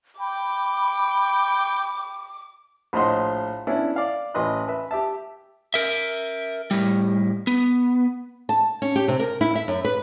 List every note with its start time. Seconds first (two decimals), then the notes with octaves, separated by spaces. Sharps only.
0.20 G5 B5 D6
2.93 A#1 A2 C5 D#5 F#5 C6
3.67 B3 C#4 D4 E4
3.96 D5 F5
4.34 A1 A2 B4 D#5 C6 F#6
4.68 B4 E5
4.91 G4 E5 A5
5.74 A#4 E5
6.71 A2 G3
7.47 B3
8.49 A5
8.82 C#4
8.96 G4
9.08 C3
9.20 A#4
9.41 E4
9.55 E5
9.68 F#2
9.84 B4